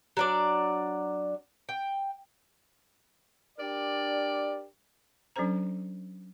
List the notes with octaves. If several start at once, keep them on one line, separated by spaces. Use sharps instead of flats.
F#3 D4 D5
G5
D4 G4 A#4 D5
F#3 C#4 D4 A4 C5 A#5